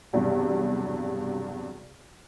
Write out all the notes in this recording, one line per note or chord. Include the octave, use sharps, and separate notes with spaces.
B1 E2 G2 C3